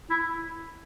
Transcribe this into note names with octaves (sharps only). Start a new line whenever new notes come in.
E4